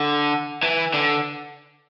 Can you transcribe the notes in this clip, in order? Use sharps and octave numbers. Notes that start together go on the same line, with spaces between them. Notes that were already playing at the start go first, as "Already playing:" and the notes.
Already playing: D3
E3
D3